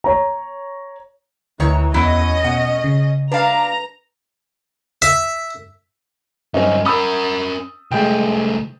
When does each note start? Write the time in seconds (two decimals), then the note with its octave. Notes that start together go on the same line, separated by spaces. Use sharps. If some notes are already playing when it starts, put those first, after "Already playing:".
0.04 C#5 A#5
1.60 D2 D#3 E3 C#5 A#5
1.94 E2 F#3 B3 C#4 E4 D#5
2.44 B2 F#5
2.84 C#3
3.32 D4 B4 F5 A5 A#5
5.02 E5
6.54 G2 F#3 C4 C#4 D#4
6.85 C#4 A#4 B5 D#6 E6
7.91 C2 G#3 A3 G5